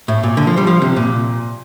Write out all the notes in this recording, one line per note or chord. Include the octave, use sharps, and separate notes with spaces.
A2
A#2
D3
F3
G3
F3
C3
A#2